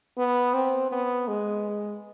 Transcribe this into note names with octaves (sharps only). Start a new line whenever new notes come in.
B3
C4
B3
G#3